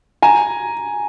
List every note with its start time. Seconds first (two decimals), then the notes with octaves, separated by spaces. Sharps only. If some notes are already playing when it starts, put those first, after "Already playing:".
0.22 G#5 A#5